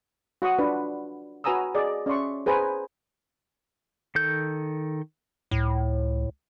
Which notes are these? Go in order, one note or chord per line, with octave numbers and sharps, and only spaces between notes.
F#4 F#5 C#6 D#6
D4 F4 B4
F#4 B4 G#5 A#5 D#6 E6
G#4 D5 D#5
C#4 D5 E5 C6 C#6
G#4 B4 C5 G#5 A#5
D#3 A4 G6
C#2 A2